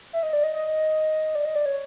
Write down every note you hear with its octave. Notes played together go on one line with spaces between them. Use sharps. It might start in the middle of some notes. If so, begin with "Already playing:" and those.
E5
D#5
D5
D#5
D#5
D5
D#5
D5
C#5